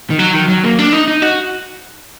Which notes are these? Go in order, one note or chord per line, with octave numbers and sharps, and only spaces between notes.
D#3
F#3
D#3
F#3
A#3
D4
D#4
D#4
F#4